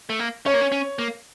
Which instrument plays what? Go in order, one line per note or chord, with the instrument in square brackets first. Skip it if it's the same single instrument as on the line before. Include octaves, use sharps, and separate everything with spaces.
[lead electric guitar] A3
A#3
[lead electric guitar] C#4 [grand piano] C#5
[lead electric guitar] A#3
C#4
C#4
A#3